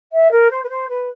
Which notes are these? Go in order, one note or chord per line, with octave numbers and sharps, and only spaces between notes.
E5
A#4
C5
B4
C5
B4